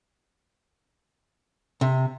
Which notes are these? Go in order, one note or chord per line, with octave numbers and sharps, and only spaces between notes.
C3